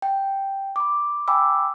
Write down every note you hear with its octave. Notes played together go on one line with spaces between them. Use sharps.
G5
B5 D6
G5 G#5 B5 D6 E6